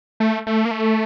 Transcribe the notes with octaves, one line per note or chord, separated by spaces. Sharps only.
A3
A3
A#3
A3